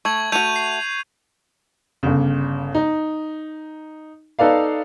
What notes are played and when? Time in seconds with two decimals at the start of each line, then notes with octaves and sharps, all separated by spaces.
0.05 A3 C#6 G#6 F#7
0.32 A3 F#4 G6 D#7 F7
0.56 C7
2.03 G1 C#3
2.75 D#4
4.39 D#4 A4 B4 D5 F5